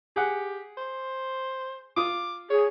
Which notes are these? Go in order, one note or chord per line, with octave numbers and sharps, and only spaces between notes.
G4 G#4 F#5
C5
F4 D6 D#6
G#4 C#5